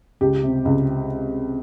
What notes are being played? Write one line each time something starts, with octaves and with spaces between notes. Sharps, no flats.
C#2 G4
C3
C#2